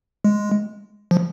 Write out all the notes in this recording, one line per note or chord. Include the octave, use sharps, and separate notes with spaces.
G#3
F3